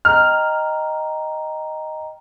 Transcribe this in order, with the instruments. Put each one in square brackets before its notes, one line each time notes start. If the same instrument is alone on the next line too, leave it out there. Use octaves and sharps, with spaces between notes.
[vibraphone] D#5 G5 A#5 [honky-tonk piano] F6